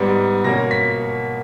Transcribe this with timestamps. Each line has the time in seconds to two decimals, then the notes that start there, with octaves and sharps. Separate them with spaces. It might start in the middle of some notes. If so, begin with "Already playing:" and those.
Already playing: G#2 G3 B3
0.44 B2 A#3 C#4 A#6
0.71 B6